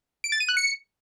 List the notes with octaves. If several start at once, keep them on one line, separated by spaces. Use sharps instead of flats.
D7
A6
D#7
F#6
C#7